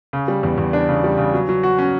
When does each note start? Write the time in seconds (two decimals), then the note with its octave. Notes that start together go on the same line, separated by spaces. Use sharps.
0.13 C#3
0.28 G3
0.43 E2
0.58 E2
0.73 D4
0.89 C#3
1.04 G3
1.18 C#3
1.34 F#3
1.49 F#3
1.63 F#4
1.78 C#4